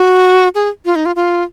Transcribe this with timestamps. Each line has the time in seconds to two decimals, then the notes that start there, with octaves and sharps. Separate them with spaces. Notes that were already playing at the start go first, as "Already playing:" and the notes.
Already playing: F#4
0.55 G#4
0.85 F4
0.96 D#4
1.06 F4
1.16 F4